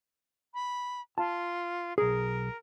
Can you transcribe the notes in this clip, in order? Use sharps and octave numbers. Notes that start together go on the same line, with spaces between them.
B5
F4 A5
B1 G#4 A#4